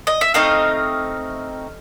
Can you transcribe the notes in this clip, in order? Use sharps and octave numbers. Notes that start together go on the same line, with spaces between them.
D#5
E5
A3 C4 D#4 D#5 F5